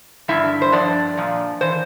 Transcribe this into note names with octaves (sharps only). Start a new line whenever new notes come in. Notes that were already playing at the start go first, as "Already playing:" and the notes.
G2 D3 G3 E4 E5
C5
G2 F3 D4 D5
A#2 F3
E3 C5